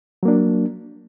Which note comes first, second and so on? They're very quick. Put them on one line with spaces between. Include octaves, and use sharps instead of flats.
F#3 A#3 D4